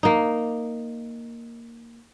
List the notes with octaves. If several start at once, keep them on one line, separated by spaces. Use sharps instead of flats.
A#3 D#4